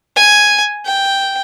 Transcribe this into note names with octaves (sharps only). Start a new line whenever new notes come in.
G#5
G5